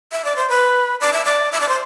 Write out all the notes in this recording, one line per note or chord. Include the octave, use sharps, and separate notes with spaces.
E5
D5
C5
B4
D5
E5
D5
E5
D5
C5